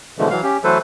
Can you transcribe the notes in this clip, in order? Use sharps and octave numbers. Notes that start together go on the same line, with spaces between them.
B2 D3 E3 F3 G#3 A3
E3 F#3 F5
C#4 G4
E3 F#3 A3 A4 B4 C5